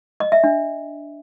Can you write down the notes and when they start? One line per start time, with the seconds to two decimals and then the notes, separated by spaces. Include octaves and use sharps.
0.20 D#5
0.32 E5
0.44 D4